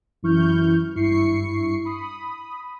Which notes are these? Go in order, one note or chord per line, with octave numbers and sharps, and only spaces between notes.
F#2 E3 E4 C#6 F6 G6
G#1 G2 E4 C#6 C7 C#7
B5 D#6